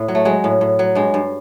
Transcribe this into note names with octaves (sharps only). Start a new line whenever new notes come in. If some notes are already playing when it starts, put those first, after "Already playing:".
Already playing: A2
F#3
A3
F#3 G#3
A2
A2
F#3
G2 G#3
G2